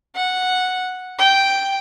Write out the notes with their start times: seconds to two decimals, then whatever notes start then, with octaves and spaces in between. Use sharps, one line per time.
0.16 F#5
1.19 G5